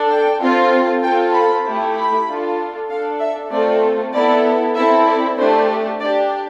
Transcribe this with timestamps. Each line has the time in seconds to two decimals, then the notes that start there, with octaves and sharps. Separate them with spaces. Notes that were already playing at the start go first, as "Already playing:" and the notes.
Already playing: D4 A4
0.08 G5
0.40 C4 F4 A4
1.02 C4 F4 A4 G5
1.33 B5
1.64 A3 E4 G4
1.95 B5
2.27 D4 F4 A4
2.89 D4 A4 F5
3.19 E5
3.51 A3 C4 F4 A4 D5
4.13 B3 E4 A4 D5
4.75 C4 E4 A4 E5
5.06 D5
5.37 A3 D4 G4 C5
5.99 D4 G4 D5